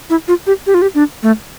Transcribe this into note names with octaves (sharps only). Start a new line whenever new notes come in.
E4
F4
G4
G4
F4
G4
D4
A3